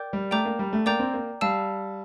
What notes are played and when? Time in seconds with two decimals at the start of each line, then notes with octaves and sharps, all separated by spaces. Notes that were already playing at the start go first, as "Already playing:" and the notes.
Already playing: A#4 D5 G5 D6 G6
0.13 G3
0.31 A3 D5 G5 A#5 D6 G6
0.45 A#3
0.59 G3
0.73 A3
0.86 A#3 D5 G5 A#5 D6 G6
0.99 C4
1.14 A#3
1.41 G3 F5 A5 E6